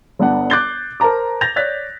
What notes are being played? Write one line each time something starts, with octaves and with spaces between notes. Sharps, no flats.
G1 B3 D4 F#5
D6 F#6 G6 A6 C7 G7
A#4 C5 A5 A#5 D6
G6 A6 A#6 F7
C#5 D5 F#6 A6 B6